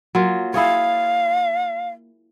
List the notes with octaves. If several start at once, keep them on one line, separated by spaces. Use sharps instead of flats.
F#3 A#3 F4
E4 G#4 C#5 F5